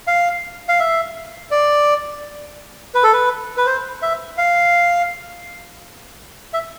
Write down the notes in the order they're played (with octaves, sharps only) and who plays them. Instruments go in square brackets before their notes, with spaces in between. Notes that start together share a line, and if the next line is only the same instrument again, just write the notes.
[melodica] F5
F5
E5
D5
B4
A4
B4
B4
C5
E5
F5
E5